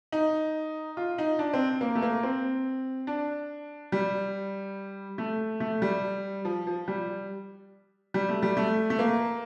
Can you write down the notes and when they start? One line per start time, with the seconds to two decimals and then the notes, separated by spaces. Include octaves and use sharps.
0.12 D#4
0.97 F4
1.18 D#4
1.39 D4
1.54 C4
1.81 A#3
1.95 A3
2.02 A#3
2.23 C4
3.07 D4
3.92 G3
5.18 A3
5.60 A3
5.82 G3
6.45 F3
6.67 F3
6.88 G3
8.14 G3
8.29 A3
8.42 G3
8.57 A3
8.90 A3
8.99 A#3